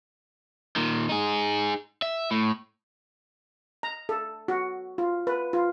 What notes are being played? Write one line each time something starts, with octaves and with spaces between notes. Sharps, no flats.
A#2 D#3
D#4 G#4
E5
A2
A#5
A4
F#4
F4
B4
F4